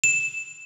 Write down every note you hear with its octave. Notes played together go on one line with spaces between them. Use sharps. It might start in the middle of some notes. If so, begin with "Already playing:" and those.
E7